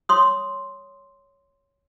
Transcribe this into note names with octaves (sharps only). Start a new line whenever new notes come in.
C#5 C6 D#6